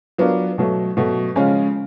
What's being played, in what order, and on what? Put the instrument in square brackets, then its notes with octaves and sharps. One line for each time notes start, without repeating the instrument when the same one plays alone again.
[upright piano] F#3 B3 D4 F4 A#4
B2 F#3 A3
B2 F#3 A3
C#3 F3 G#3 C#4 F4